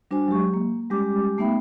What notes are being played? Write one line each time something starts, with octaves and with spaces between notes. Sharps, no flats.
G3 D4 F#4 C5 G#5
F#3 G#3 G4 C#6
A#3
G3 G#3 C#4 G4 D6
A3 B3 D#4 E5 G5 B5